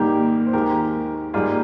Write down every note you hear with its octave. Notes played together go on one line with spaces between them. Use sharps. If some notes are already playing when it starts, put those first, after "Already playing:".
Already playing: G#2 D#3 G3 A#3 G4 A#4
C5
D#2 D#3 G#3 G4 A#4
G#2 G3 A#3 F4 G#4